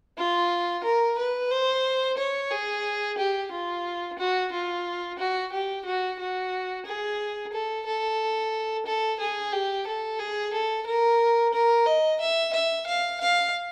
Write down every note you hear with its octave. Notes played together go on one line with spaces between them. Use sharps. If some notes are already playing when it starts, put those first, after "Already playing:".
F4
A#4
B4
C5
C#5
G#4
G4
F4
F#4
F4
F#4
G4
F#4
F#4
G#4
A4
A4
A4
G#4
G4
A4
G#4
A4
A#4
A#4
D#5
E5
E5
F5
F5